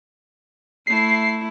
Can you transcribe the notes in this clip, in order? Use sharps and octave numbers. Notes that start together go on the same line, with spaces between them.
A3 E4 C7